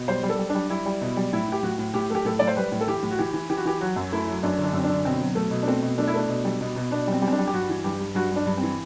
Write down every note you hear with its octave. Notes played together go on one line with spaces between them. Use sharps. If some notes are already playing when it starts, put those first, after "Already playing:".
Already playing: B2
G3 C5
G3
A4
G3
D4
G3
G3 E4
G3
B2
G3
A2 E4
A2 G4
A2 F#4
A2
A2 G4
A3 G4
A2 A4
A2 D5
C5
G3 B4
A2
A4
E3 G4
A2
F#4
E3 G4
E3
E3 G4
F#4
E3 G4
F#3 F#4
F#2
A3 E4
F#3
F#2 D4
D3
D4
F#2 C4
D4
D3
B2 C4
F#3
A3
B2
D4
A3 C4
B2
A3 D4
E4
A3 D4
B2
G3
B2
B2
B2 D4
G3 C4
G3
C4
D4
G3
G4
G2 F#4
E3
G2 G4
G2
G2 F#4
G2 D4
G2
C4
E3